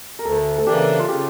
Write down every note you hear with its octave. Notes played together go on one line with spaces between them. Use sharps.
A#4
D2 A4
A4
C#3 E3 A#3 D4 G4
F4
C#3 G4